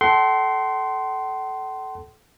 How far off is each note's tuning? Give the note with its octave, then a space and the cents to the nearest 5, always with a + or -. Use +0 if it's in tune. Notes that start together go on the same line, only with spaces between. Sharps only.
A4 -15 F#5 +45 C6 +0